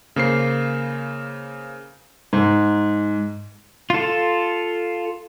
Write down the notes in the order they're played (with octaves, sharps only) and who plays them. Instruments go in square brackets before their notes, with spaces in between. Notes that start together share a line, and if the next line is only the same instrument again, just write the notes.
[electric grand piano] C#3 A#3 C5 C7
[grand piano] G#2
[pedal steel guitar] F4 A4